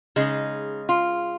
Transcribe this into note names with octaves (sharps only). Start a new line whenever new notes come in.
C#3 G#3 D#4
F4